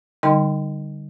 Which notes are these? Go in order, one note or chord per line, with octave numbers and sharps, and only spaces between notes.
D3 G3 D#4 D#5 G5 C6